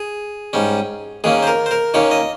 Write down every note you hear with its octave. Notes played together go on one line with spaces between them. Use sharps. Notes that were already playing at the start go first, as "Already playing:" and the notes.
Already playing: G#4
G#2 G3 C#4
D#2 D#3 A#3 C#4 G#4
C5
A#4
C5
A#4
D#2 D#3 A#3 C#4 C#5
D#5